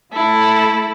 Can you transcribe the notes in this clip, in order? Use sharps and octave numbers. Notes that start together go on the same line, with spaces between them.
A3 E4 A4